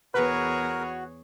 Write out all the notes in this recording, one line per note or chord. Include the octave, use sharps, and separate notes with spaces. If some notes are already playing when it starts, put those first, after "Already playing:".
E2 F#4 G#4 A#4 B4 C#5